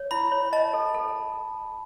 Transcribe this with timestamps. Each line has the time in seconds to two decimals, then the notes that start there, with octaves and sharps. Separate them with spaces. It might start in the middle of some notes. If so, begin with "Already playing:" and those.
Already playing: C#5
0.11 E4 B5
0.32 C#5
0.53 D#5 A5
0.73 A4
0.94 A4